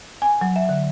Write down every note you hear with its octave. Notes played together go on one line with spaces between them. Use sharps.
G#5
F#3
E5
D3